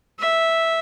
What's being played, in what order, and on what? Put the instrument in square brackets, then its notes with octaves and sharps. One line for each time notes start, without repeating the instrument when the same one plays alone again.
[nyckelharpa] E5